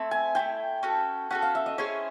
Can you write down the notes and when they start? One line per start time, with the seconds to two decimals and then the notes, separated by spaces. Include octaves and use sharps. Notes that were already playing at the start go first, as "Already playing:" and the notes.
Already playing: A3 C4 E4
0.11 G#5
0.35 A3 C4 E4 G5
0.83 C#4 F#4 A4
1.30 C#4 F#4 A4 F#5
1.42 F5
1.55 E5
1.66 D#5
1.78 C#4 E4 G#4 C5 C#5